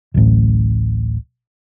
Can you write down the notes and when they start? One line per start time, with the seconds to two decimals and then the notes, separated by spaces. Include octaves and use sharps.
0.14 D1 A1